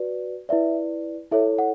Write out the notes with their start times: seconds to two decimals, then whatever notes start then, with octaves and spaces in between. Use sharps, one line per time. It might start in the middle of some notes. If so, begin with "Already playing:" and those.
Already playing: F#4 B4 D5
0.49 E4 B4 D5 E5
1.31 E4 A4 C#5 E5
1.59 F#5